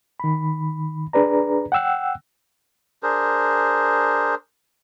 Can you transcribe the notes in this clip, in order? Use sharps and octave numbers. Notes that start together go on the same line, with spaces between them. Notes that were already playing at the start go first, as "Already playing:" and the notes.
D#3 B5
D4 G#4 B4 D5 A#5
F#5 G5 E6 F#6
D4 G#4 A#4 C5